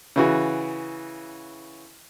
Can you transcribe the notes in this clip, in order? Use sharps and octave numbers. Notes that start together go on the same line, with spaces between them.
C#3 E3 F#4